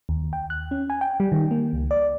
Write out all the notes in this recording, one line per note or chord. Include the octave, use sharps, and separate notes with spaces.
D#2
G5
F#6
C#4
G#5
G5
G3
D#3
A#3
C#2
D5